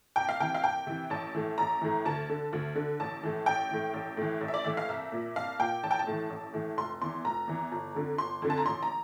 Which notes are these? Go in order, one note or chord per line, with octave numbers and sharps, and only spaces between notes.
C2 G5
F5
C3 E3 G5
F5
C2 G5
C3 E3
A1 A5
A2 E3
A1 A#5
A2 E3
D2 A5
D3
D2
D3
A1 A5
A2 E3
A1 G5
A2 E3
A1
A2 E3
A1
E5
D5
A2 E3 E5
F5
C2 E5
A#2
C2 F5
A#2 G5
A1 A5
G5
A5
A2 E3
A1
A2 E3
F1 C6
E2 E3 C6
F1 A#5
E2 E3
G1
F2 D3
G1 C6
F2 D3
A5
A#5
A1 C6
A#5